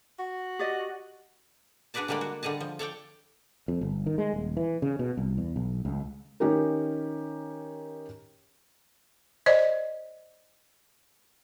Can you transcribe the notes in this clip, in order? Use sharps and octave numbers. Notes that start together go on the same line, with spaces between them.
F#4
G4 D5 D#5
D4 F#4 G#4 B4 D5 A5
D3 G3 G#3 A#3 D5
F#4
D3 G3 G#4 D#5 A5
F3
A4 C#5 D5 G5
F2
G1
D#3
G#3
D#1
E3
C#3
B2
C2
E2
B1
C#2
D#3 C#4 D#4 G4 A#4
C5 D5 D#5